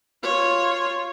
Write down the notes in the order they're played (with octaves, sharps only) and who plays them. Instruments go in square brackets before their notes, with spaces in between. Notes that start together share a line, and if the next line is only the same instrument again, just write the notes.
[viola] F4 C#5